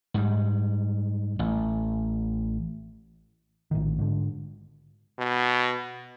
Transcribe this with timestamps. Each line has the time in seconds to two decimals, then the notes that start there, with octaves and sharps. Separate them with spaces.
0.14 G#2 G3
1.39 A1
3.71 A#1 A2 D#3
3.99 G#2 D3
5.19 B2